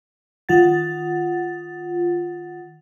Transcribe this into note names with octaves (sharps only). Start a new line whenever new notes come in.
D#3 F4 F#5 A6